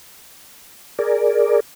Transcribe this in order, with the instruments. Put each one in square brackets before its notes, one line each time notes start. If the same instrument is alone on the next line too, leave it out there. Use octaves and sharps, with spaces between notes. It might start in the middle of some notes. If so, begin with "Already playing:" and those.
[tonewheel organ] G#4 A#4 D5